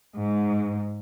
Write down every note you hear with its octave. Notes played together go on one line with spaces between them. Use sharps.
G#2